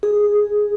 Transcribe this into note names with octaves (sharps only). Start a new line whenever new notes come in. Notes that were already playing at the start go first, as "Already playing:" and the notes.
G#4